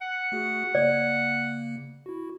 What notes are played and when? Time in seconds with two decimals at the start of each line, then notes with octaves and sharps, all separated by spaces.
0.02 F#5
0.32 A3 F#4 G#4
0.75 C#3 A#3 D5
2.06 E4 F#4